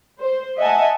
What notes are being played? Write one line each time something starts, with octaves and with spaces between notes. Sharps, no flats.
C5
D#5 E5 F#5 G#5 A5